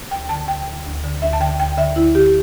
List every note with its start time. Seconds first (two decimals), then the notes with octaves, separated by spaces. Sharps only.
0.11 D2 G5
0.29 D3 A5
0.48 D2 G5
0.67 D3
0.86 D2
1.04 D3
1.22 D2 E5
1.33 A5
1.41 D3 G5
1.59 D2 G5
1.77 D3 E5
1.96 D2 E4
2.15 D3 G4